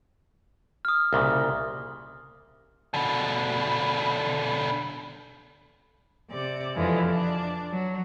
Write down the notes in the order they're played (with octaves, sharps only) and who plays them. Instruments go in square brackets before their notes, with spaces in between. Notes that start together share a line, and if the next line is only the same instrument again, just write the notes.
[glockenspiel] D#6 F6
[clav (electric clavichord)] C2 A#2 C#3
[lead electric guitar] B2 D3
[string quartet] C3 D5
F2 D3 E3 F3 G#3
D4
F#3